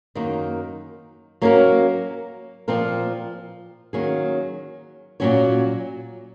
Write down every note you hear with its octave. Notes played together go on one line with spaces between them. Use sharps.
F#2 D#3 A#3 D#4
F#3 A#3 C#4 F#4 A#4
A#2 F3 C4 F4 A#4
D#3 F#3 A#3 C#4 G#4
A#2 F#3 C#4 F#4 C#5